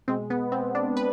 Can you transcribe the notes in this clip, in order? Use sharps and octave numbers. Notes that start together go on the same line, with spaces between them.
B2 G#3 C4
B3
C4
D4
B4